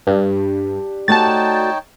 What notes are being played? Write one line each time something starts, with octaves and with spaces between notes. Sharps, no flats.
G2 D4 G4
A3 D#4 F#4 C#5 D5 G5 A5 A6